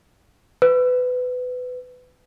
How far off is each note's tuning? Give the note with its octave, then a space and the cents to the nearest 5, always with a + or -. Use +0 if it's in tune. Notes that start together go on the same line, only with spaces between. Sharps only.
B4 +20